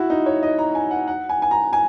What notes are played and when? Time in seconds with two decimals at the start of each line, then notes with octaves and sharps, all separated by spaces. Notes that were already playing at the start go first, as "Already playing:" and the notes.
Already playing: E4 F#4
0.10 D#4
0.26 C#5
0.43 D#5
0.58 A#5
0.75 G#5
0.91 F#5
1.07 F#5
1.29 G#5
1.42 G#5
1.51 A#5
1.73 G#5